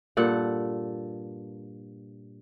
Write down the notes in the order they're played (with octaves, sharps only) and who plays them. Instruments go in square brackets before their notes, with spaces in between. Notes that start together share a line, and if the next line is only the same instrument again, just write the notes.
[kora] G2 A#2 A4 F#5